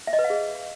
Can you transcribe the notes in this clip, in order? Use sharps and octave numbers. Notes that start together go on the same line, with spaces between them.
E5
D#5
B4
F5
G#4